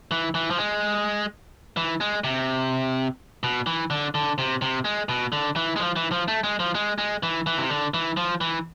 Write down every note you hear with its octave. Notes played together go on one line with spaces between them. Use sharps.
E3
E3
F3
G#3
E3
G#3
C3
B2
E3
D3
D3
C3
C3
G#3
B2
D3
E3
G#3
F3
E3
F3
A3
G#3
F3
G#3
G#3
E3
E3
C3
D3
E3
F3
E3